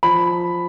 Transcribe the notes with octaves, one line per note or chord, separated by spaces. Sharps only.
F3 B5